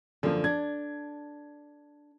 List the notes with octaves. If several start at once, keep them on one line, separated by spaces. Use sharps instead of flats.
F#2 D3 F3 A#3
D4 G#6